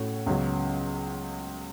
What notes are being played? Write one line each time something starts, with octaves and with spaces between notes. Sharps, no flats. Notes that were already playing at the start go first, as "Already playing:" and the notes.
Already playing: A2 A3 C#4 F#4
C#2 C#3 F#3 B3